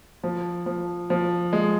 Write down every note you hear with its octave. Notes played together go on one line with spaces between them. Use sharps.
F3
F3
F3
G#3